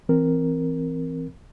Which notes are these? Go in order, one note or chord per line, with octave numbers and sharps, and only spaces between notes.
E3 C4 A#4